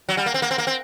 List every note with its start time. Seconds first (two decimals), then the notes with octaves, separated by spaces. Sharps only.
0.09 F#3
0.17 G3
0.26 A#3
0.34 C4
0.42 A#3
0.51 C4
0.58 A#3
0.67 C4